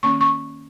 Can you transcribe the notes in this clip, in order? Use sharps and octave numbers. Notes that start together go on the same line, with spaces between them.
D#3 A#3 C#4 C#6
C#6